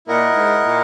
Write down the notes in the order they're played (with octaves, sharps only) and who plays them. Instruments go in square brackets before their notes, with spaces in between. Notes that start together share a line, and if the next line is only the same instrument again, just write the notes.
[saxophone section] A#2 [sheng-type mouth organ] E4 A#4 D#5 F#5
[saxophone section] G#2
A#2